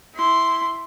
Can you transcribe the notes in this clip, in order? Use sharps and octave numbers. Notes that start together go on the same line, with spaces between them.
E4 C6